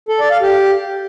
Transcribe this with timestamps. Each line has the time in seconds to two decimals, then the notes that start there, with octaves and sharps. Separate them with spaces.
0.09 A4
0.20 D5
0.31 F5
0.42 G4